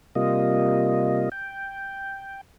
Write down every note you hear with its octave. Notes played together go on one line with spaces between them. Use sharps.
C3 G3 A#3 F4 D#5
G5